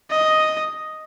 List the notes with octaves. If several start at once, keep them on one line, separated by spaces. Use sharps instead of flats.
D#5